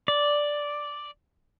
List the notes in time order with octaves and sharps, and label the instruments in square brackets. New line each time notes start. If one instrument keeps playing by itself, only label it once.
[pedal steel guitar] D5